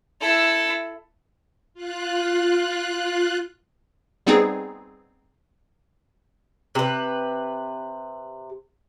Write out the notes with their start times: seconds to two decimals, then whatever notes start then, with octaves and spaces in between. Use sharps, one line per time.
0.21 E4 A4
1.74 F4 F#6
4.26 G3 B3 C4 D#4 G#4
6.75 C3 B4